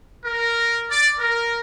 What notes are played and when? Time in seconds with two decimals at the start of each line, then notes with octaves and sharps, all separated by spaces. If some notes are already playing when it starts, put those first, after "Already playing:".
0.25 A#4
0.91 D5
1.19 A#4